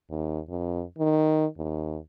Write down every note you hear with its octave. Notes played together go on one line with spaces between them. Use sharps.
D#2
F2
D#3
D#2